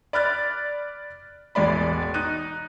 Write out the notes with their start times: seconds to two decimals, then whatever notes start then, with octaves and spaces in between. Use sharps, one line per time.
0.13 D5 B5 F6 F#6 A6
1.55 E1 A1 G#3 D5 B5
2.14 D#4 F#6 D#7